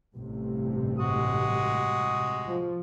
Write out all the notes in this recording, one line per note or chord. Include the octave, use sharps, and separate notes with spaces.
A1 G2 C3
G#3 F#4 D#6
F3